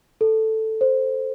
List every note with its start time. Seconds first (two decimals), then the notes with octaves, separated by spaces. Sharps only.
0.21 A4
0.81 C5